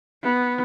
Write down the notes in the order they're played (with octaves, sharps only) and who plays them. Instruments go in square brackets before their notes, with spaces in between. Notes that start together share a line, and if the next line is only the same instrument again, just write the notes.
[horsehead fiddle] B3